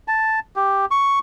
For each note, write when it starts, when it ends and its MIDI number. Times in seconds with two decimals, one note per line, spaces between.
0.08 0.39 81
0.56 0.86 67
0.91 1.19 85